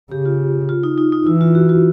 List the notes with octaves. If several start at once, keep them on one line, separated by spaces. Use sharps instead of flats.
C#3 G4
F4
F4
D#4
D#4
D#4
E3 E4
F4
F#4
F4